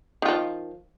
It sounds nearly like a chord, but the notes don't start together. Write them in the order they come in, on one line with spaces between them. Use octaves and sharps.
D#3 F4 F3